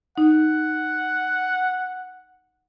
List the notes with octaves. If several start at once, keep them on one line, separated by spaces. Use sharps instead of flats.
D#4 F#5